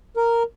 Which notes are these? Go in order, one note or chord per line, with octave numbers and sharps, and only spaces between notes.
A#4